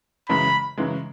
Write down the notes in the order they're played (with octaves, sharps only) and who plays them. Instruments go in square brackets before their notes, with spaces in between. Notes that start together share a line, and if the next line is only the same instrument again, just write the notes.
[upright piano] F#2 C#3 E3 G#3 [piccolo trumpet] B5
[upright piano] F#2 C#3 E3 G#3